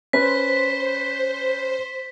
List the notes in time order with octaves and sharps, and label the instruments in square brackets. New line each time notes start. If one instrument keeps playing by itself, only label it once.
[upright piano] C#4 B4 [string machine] C5 [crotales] B6